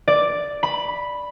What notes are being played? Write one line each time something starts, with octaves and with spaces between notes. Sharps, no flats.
D5
B5